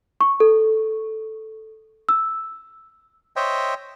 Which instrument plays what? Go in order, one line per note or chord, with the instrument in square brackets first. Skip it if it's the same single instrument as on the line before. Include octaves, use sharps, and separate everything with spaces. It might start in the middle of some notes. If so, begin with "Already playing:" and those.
[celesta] C#6
A4
E6
[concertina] C5 C#5 D#5 E5 G5